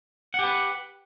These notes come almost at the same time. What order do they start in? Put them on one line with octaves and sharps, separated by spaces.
F#5 G4 B4